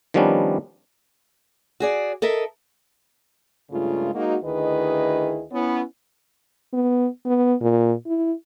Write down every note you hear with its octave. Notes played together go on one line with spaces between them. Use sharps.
D#3 F3 G3 B3 C#4 D4
F#4 G#4 D5
A4 A#4 D#5 E5
G2 C#3 G#3 A3 F4
G#3 A#3 D#4 F#4
D2 D#3 E4 G#4 B4 D#5
B3 C#4 E4
B3
B3
A#2
E4